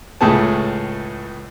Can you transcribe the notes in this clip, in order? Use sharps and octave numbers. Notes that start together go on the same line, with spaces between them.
C#2 A2 A3 G#4 A5